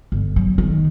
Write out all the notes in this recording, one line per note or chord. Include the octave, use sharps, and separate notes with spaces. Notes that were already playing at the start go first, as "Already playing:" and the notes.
G1
F#3
D#3